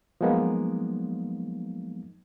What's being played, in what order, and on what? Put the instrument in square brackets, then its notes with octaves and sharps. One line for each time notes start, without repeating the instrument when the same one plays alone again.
[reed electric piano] F3 F#3 G#3 A#3 B3 D#4